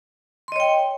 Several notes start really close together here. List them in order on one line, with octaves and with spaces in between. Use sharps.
C6 D#5 C#5 G5